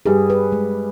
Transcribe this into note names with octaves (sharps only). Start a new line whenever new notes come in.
G2 G3 G#4
B4
G#3